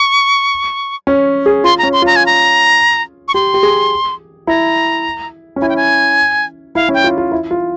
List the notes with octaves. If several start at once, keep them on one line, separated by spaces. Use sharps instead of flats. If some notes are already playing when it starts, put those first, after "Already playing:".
Already playing: C#6
C#4
G#4
F4 C6
C#4 A#5
C6
F4 A#5
G#5
A#5
C#6
G4 C6
G4
G#4
E4 A#5
C#4
E4 G#5
G5
G#5
E4 F5
C#4
G5
F4
F4
E4
F4